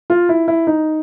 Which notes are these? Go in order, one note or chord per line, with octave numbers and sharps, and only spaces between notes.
F4
E4
E4
D#4